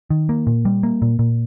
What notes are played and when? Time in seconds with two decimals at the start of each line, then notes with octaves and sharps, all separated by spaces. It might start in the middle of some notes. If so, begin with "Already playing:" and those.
0.10 D#3
0.29 A#3
0.47 A#2
0.65 G3
0.83 A#3
1.02 A#2
1.19 A#2